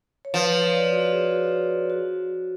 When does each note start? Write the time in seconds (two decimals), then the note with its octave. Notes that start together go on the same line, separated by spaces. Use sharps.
0.25 C#5
0.34 F3 B4
0.53 C#5
0.73 D5
0.92 F#4
1.12 G#4
1.31 F#4
1.90 F#4